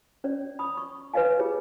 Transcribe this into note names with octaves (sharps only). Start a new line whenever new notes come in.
C#4 C#5 D5
B5 D#6
C#6
B4 C#5 D#5 F5 G#5
F4 G4 G#4 C#5